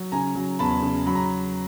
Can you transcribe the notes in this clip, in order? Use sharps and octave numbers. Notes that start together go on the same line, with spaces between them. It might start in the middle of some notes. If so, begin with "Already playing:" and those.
Already playing: F#3
C#3 G#5 A#5
F#3
E2 A5 B5
C#3
F#3 B5
A#5